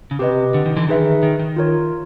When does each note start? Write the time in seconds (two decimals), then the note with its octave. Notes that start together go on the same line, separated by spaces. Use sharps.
0.11 C#3
0.19 C3 G4 B4 D#5
0.54 D3
0.66 D#3
0.76 D3 E3
0.88 D#3 D#4 G#4 B4 E5
1.23 D#3
1.39 D#3
1.56 F4 A#4 C#5